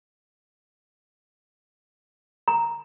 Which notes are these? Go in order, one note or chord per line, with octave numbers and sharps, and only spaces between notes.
A#5